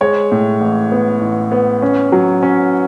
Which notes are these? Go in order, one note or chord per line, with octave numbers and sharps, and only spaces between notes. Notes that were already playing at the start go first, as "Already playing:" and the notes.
G#3 C#5
A2
A1
B3
A1
B3
C#4
F#3
C#4